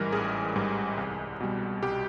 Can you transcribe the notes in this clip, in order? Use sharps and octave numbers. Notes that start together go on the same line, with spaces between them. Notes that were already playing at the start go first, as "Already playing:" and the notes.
Already playing: A1 G#2 E3 G3 A#4
A1 G#4
G#2 E3 G3
C2
B2 G3
C2 G4